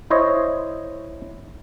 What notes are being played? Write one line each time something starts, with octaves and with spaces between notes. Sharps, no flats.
E4 C5 C#5 D#5